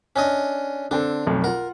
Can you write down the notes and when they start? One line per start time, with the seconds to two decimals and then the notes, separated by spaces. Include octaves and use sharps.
0.16 C#4 D4 D#5
0.91 D3 C4 D4 A4
1.27 B1 F2 A3
1.44 F4 A#4 F#5